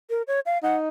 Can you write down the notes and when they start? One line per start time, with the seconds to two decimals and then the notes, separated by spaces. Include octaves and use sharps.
0.10 A#4
0.28 C#5
0.46 F5
0.63 D#4 F#5